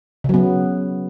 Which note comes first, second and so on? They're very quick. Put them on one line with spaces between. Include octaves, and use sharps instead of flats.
C#3 F#3 B3